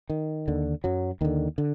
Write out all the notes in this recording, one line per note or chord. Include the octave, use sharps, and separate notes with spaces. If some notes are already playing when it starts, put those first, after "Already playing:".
D#3
D#2 D3
F#2 F#3
D#2 D3 D#3
D3